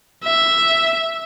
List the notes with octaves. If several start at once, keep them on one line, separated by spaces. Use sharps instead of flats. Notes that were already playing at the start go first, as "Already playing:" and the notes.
E5